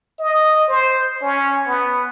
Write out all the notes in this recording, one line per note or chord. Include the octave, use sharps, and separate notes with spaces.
D#5
C5
C#4
B3